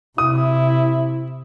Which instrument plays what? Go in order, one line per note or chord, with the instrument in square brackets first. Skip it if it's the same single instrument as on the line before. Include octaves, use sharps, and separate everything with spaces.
[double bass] C3 [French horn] E4 [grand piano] D#6